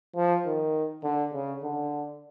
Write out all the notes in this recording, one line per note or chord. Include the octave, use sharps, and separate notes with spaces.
F3
D#3
D3
C#3
D3